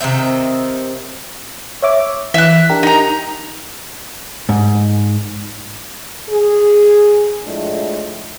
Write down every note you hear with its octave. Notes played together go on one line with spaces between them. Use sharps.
C3 D#3 C4 E5
C#5 E5 D6
E3 E5 F#6
D4 G4 A#4
D#4 A#5
G#2
G#4
A2 F3 G#3 A3 D4